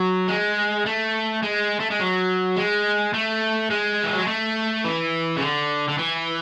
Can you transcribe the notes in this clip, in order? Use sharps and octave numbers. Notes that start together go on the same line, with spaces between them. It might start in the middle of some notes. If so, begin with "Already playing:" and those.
Already playing: F#3
G#3
A3
G#3
A3
G#3
F#3
G#3
A3
G#3
E3
F#3
G#3
A3
E3
C#3
D3
D3
E3